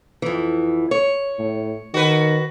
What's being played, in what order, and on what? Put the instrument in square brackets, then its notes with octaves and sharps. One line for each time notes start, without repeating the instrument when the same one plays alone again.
[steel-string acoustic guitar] F2 E3
C#5
[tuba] A2
[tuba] D#3 [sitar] F#4 B4